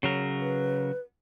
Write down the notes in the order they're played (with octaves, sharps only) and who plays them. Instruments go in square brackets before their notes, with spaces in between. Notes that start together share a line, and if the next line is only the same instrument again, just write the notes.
[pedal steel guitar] C#3 F#3 A#4
[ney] B4